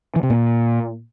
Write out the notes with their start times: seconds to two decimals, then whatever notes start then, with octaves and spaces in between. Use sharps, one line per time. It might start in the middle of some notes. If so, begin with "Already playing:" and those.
0.16 E3
0.23 C3
0.30 A#2